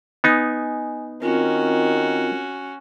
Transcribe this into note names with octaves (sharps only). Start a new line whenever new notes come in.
B3 D#4 D#5 G#5
D#3 C4 C#4 F4 F#4 A#4